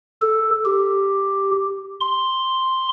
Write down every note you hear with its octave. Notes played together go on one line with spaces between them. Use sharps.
A4
G4
C6